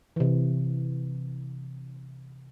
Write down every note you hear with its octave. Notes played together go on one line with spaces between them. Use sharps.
C3 E3